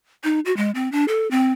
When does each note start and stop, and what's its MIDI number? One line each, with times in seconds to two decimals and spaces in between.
0.24 0.40 63
0.45 0.55 66
0.57 0.71 56
0.75 0.91 60
0.92 1.05 62
1.08 1.30 69
1.31 1.52 60